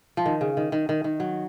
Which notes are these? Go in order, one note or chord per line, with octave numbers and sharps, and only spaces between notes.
F3
D#3
C#3
D#3
D#3
D#3
D#3
F#3